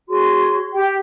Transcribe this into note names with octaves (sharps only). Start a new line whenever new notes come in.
F#4 G#4 C#5 C6
G4 G5